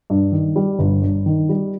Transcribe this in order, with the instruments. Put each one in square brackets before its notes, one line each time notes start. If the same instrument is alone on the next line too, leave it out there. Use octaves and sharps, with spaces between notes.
[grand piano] G2
D#3
G3
G1
G2
D#3
G3